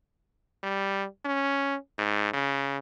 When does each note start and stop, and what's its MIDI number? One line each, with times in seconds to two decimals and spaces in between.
0.63 1.06 55
1.25 1.76 61
1.98 2.30 44
2.33 2.78 49